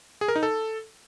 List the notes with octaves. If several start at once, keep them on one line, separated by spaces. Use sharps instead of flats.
G#4
A#4
D#4
A4